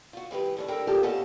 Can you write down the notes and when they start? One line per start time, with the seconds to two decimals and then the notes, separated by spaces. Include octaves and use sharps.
0.13 F4 F#4
0.31 E3 G#3 G4 B4
0.57 D#2 D3 D4
0.68 G3 D4 E4 A4 A#4 G5
0.87 A#2 F4 G4 A4 A#4
1.03 B3 C#4 A4 D#5 F5 A5